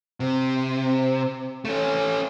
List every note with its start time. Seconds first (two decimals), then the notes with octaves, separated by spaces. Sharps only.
0.20 C3
1.65 A3 C#4